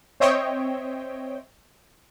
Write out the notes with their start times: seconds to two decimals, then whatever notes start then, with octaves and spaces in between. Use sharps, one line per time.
0.20 C4 C5 C#5 D#5 E5 G5